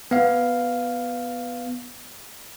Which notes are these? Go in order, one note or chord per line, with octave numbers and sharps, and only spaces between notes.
B3 F5